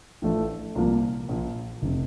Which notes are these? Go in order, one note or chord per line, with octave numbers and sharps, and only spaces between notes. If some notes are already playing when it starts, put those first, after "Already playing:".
A1 A2 F3 A3 D4
C2 A#2 F3 A#3
A#1 A#2 F3
F1 C3